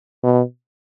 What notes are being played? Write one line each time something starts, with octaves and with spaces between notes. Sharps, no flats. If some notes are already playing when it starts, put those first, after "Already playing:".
B2